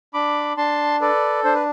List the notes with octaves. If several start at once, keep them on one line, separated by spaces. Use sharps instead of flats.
D4 B5 D6
D4 A5 C6
A4 B4 D5
D4 C5
B4